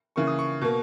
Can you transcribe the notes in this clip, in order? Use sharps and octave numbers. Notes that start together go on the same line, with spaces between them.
C#3 E3 A#3 C#6
D#6
C#6
B2 A#3